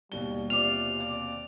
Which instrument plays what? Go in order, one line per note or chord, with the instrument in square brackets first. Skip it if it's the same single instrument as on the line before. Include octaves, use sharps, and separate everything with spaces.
[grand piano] D#2 B2 G7 [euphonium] G3
[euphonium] C3 [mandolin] F4 D5 [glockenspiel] F7
[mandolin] D5